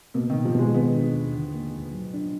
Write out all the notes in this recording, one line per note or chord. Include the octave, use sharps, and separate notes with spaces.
B2 A#3
D#3
B2
F3
B2 G#3
D#3 B3
D4
D#2
D3
A#3
D2
F#3
D4